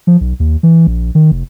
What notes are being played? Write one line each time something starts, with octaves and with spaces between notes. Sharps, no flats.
F3
B1
D#2
E3
A#1
D#3
F1